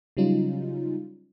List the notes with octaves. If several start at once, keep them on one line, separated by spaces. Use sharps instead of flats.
C#3 F#3 G3 C#4 D#4 F4